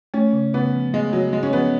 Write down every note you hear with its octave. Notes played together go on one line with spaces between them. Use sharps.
A3 C#4
C#3
C#3 B3
F3
G#3 A3
C#3 F#3
C#3 G#3
C#4
F3 B3